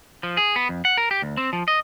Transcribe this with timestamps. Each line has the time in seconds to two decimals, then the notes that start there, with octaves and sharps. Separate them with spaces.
0.23 F3
0.37 G#4
0.56 B3
0.69 F2
0.85 F#5
0.97 A#4
1.11 G4
1.22 D2
1.37 C4
1.53 F3
1.68 D#5